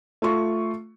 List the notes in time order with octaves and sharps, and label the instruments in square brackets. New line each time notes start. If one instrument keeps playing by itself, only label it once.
[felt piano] A3 F4 C#6